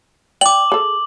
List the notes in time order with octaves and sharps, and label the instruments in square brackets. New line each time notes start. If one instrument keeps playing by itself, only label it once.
[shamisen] D5 G5 [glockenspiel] D6 F#7
[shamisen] G#4 A4